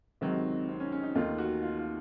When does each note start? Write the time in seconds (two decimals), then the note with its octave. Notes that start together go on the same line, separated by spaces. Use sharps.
0.21 C#2 C3 D#3 F#3 C4
0.69 C4
0.80 C#4
0.92 C#4
1.03 D#4
1.15 D#2 D#3 A3 F4
1.38 F#4
1.63 F4
1.79 F4